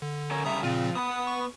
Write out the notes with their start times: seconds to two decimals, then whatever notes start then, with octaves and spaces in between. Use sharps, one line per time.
0.02 D3
0.31 C#4 A#4 C#5
0.45 C#3 G3 A3 E5 A#5 D#6
0.63 A#2 C#3 F3 C4 F4
0.95 B3 B4 F#5 D#6
1.27 C#6